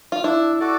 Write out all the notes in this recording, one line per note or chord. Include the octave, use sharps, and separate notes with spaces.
F4
D4 E4
F#4 A4 D5